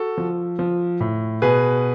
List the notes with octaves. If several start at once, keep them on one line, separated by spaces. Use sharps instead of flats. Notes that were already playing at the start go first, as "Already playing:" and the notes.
Already playing: F#4 A4
F3
F3
A2
B2 G#4 B4